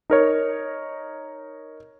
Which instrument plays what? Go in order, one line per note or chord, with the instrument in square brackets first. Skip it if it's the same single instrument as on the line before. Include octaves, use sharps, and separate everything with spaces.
[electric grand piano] D#4 A#4 C#5